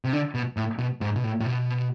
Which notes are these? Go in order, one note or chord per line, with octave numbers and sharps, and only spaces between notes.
C3
D3
B2
A2
B2
G#2
B2
A2
A2
B2